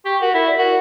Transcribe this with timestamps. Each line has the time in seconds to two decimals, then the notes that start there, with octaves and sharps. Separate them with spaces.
0.05 G4 C#6
0.21 F#4 A#4
0.34 E4 A#4
0.47 D5
0.58 F#4 A#4